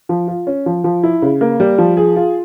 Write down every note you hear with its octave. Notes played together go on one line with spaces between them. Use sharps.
F3
F4
C#4
F3
F3
E4
C#3
A#3
G3
F3
G#4
F4